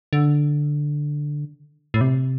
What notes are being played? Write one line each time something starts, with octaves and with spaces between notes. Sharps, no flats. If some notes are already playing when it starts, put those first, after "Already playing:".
D3
A2
C3